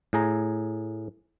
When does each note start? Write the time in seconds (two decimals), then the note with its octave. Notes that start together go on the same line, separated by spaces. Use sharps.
0.13 A2 G#4 A#5